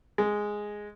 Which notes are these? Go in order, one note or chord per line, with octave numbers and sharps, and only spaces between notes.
G#3